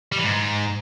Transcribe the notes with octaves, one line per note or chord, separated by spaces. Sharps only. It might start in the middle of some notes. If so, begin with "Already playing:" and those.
G3
E3
G#2